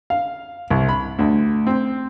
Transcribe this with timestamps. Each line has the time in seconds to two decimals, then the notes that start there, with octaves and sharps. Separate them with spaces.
0.10 F5
0.71 C2
0.89 B5
1.19 D2
1.67 C4